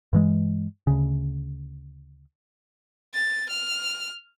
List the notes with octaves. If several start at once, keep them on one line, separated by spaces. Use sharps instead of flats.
G2 E3 G#3
D2 C#3
A6
F6